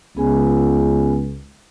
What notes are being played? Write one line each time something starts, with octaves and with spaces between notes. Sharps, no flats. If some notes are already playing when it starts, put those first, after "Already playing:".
C#2 B3 G#4 G#5